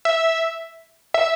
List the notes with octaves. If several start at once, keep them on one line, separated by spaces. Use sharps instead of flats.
E5
E5